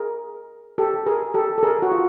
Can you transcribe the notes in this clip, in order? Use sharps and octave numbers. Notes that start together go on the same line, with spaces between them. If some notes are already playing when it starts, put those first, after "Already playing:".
Already playing: G#4 A#4
G4 A4
G#4 A#4
G4 A4
A4
G#4 A#4
F#4
F4